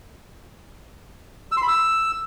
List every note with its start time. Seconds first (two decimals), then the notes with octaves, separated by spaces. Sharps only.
1.52 E6
1.57 C6
1.62 B5
1.68 E6